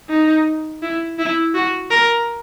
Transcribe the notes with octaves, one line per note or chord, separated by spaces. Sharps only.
D#4
E4
E4
F#4
A#4